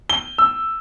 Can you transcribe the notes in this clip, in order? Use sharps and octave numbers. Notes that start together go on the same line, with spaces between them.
G7
E6